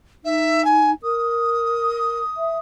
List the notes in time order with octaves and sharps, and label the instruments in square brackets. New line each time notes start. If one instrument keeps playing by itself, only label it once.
[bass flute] D#4 [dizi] E5
[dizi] G#5
[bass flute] A#4 [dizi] D#6
[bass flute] E5